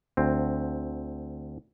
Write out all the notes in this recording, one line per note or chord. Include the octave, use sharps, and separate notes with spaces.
D2 C4